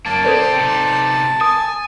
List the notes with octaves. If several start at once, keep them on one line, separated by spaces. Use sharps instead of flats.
F#2 A#3 A5
C4 G4 A4 C5 D5
C3 D#4
G#5 D#6